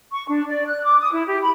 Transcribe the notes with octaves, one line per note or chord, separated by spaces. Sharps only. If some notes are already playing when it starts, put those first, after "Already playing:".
C#6
D4
D5
F#6
D6
D#6
E4
G4
B5